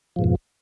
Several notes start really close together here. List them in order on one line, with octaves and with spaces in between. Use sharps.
F3 G#2 B2 F2